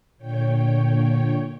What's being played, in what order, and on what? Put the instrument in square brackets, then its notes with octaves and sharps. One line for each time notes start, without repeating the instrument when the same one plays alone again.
[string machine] A#2 D3 C#5 G5